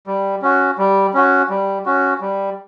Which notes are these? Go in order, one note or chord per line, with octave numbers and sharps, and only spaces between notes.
G3
C#4 F#4
G3
C#4 F#4
G3
C#4 F#4
G3